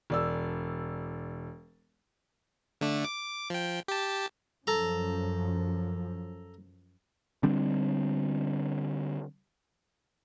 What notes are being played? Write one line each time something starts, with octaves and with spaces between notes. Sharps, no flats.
E1 D5 E6
D3 A3 D4
D6
F3 G5
G4 A5
F#2 F3 A4 A#5
D3 G3 C4 D4